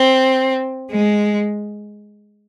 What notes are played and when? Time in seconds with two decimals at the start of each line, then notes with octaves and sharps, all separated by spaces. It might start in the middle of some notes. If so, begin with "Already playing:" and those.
Already playing: C4
0.90 G#3